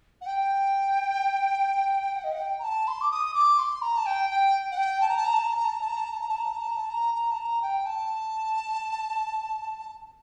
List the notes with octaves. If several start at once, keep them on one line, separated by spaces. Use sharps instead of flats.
F#5
G5
F#5
D#5
F#5
G5
A#5
A5
C6
D6
D#6
D6
C6
A#5
A5
G5
G5
F#5
G5
A5
A#5
A5
A#5
A5
A#5
A5
A#5
A5
A#5
A5
A#5
A5
A#5
A5
A#5
A5
A#5
A5
A#5
A5
A#5
A5
A#5
A#5
A5
A#5
G5
A5